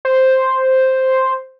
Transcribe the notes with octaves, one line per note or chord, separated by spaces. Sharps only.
C5